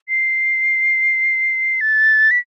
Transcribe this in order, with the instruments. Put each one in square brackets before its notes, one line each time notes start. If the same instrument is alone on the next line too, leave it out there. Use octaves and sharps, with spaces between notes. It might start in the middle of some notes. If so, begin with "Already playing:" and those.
[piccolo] C7
A6
B6